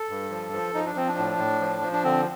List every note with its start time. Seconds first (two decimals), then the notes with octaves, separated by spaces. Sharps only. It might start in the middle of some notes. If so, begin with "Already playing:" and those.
Already playing: A4
0.10 G2
0.30 F3
0.53 F3
0.74 F3 D#4
0.86 D4
0.95 F3 C4
1.08 D4
1.18 A2
1.39 A2
1.60 F3
1.82 F3
1.92 D4
2.04 D3 C4